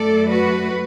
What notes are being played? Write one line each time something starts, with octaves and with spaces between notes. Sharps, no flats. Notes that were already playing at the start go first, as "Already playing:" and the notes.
Already playing: F#2 F#3 A3 A4 D5
F#4 B4